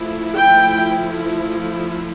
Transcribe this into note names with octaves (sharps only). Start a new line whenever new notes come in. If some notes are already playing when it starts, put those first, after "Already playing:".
Already playing: F3 A3 E4
G5